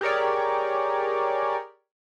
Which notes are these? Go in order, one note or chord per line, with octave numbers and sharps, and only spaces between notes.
G4 G#4 A#4 C#5 D5